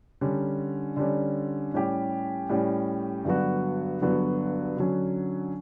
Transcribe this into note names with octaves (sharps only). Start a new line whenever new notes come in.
D3 G3 C#4
D3 G3 C#4
A2 G3 C#4 G4
A2 G3 C#4 G4
G2 D3 F#3 B3 F#4
G2 D3 F#3 B3 F#4
D3 F#3 C#4